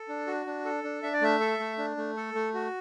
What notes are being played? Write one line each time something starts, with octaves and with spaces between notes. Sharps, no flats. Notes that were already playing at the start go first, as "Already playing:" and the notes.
Already playing: A4
D4
F#4
D4
A4
D4
D4 E5
D5
A3 E5
A4
A3
D4
A3
A4
A3
F#4